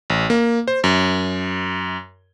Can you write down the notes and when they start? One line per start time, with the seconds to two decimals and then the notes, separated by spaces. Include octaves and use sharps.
0.10 A1
0.30 A#3
0.68 C5
0.84 F#2